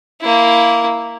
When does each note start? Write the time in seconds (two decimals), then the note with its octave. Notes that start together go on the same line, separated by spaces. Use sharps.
0.21 A#3 E4